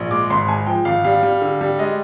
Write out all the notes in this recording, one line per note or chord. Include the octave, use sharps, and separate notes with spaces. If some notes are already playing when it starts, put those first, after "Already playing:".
Already playing: A#1
G#3 D6
G#1 C6
G#3 G#5
F3 G5
G#1 F5
G3 F5
G3
D3
G3
G#3 D#5